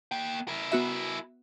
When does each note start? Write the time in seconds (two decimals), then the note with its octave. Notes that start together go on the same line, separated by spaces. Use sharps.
0.12 A#3 G5
0.48 E4 A#4
0.72 B3 F#4 E5